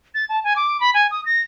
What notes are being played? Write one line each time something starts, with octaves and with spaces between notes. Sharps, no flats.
A6
A5
G#5
D6
B5
G#5
D#6
A#6